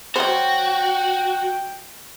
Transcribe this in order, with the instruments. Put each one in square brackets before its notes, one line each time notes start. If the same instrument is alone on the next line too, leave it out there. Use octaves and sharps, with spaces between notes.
[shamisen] F#3 C5 [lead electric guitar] F#4 [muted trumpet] G5